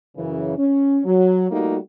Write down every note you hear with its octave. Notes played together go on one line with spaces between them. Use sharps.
F#2 C#3 E3
C#4
F#3
G3 A3 A#3 D#4 F4 F#4